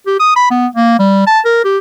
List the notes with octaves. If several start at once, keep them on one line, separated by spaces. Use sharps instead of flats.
G4
D#6
B5
B3
A#3
G3
A5
A#4
G4